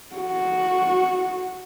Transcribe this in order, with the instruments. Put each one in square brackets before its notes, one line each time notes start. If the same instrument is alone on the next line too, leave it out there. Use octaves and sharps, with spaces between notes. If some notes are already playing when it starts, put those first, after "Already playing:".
[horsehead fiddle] F#4